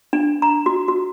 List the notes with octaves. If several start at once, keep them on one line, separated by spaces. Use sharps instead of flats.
D4
A#5
F#4
F#4